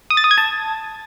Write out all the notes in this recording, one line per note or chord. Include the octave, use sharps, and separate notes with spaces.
D#6
A6
D#6
G#6
A5